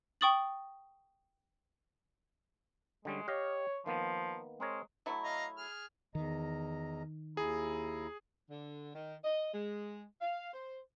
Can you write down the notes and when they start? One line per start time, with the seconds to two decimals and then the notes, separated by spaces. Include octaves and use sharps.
0.21 G5 C#6 D#6 A6 F#7
3.05 D3 G3 G#3 C#4
3.28 G4 C#5 D#5 F5
3.86 D#3 F3 A#3 B3
4.60 G#3 C4 A#4 C#5
5.06 F#3 A3 E4
5.24 D#5 F5 A#5
5.57 G#4 F6
6.15 E2 D#3 D#5 A#5
7.37 D#2 E4 G#4 A#5
8.50 D3
8.94 D#3
9.24 D#5
9.53 G#3
10.21 F5
10.53 C5